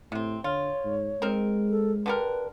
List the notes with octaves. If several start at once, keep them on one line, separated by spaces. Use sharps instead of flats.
A2 C3 C4
D3 F4 C#5
G#2
G#3 C4 D#4 A#4
A4
D3 G4 A#4 B4